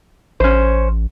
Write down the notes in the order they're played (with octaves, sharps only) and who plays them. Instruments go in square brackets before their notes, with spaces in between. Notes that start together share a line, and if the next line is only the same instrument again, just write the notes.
[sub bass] A1 [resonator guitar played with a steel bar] C#4 C5